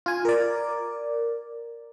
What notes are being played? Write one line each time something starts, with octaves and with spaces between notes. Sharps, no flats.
F4 G#5
A#4 D5